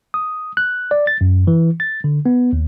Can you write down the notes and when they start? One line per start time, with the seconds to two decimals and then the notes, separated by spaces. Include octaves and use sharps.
0.14 D#6
0.57 F#6
0.91 D5
1.07 A6
1.21 F#2
1.47 E3
1.80 A6
2.04 D3
2.26 B3
2.53 D#2